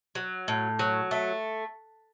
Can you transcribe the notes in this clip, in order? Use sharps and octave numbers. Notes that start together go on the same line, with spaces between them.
F#3
A2
F#3
A3